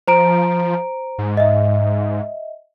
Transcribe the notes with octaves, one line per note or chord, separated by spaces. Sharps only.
F3 C5 A#5 D7
G#2
D#5 E5